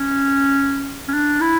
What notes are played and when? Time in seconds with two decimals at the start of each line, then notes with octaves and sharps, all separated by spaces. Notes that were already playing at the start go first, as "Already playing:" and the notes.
Already playing: C#4
1.08 C#4
1.14 D4
1.41 E4